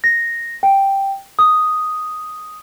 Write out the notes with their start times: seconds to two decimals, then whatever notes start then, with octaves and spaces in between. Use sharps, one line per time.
0.04 A#6
0.63 G5
1.39 D#6